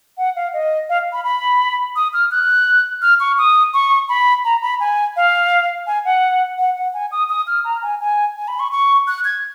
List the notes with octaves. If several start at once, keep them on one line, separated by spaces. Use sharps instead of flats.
F#5
F5
D#5
F5
B5
B5
D#6
F6
F#6
F6
C#6
D#6
C#6
B5
A#5
B5
G#5
F5
G#5
F#5
F#5
F#5
G#5
D#6
D#6
F6
A#5
G#5
G#5
G#5
B5
C#6
C#6
F#6
G#6